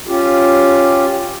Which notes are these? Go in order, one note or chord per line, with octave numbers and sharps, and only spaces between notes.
C#4 F4 G4